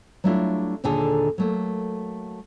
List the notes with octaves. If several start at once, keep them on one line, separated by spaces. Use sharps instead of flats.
F#3 G3 A3 D4 E4 F4
D#2 A#2 D3 G#4 A4
F#3 A3 A#3